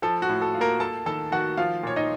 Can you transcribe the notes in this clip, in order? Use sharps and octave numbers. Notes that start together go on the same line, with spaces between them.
F3 A4
F#4
A2
A4
F4
A#3 A#4
A#3 A4 A5
D#3 A4 A5
D#3 F#4 F#5
F3 F4 F5
A#2 C#5
D#4 D#5